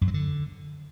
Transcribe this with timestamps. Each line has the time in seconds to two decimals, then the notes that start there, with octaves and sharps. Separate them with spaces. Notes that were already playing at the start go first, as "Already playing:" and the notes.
0.01 F#2
0.08 F#3
0.14 D3